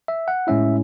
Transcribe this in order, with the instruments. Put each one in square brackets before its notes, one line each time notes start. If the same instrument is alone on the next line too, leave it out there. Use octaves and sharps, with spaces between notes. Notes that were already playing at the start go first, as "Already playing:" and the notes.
[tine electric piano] E5
F#5
A2 G#3 C#4 E4 E5